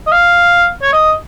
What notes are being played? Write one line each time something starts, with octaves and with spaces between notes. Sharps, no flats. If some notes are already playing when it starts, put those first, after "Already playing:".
D#5
F5
C#5
D#5